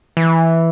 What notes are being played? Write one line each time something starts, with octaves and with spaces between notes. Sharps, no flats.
E3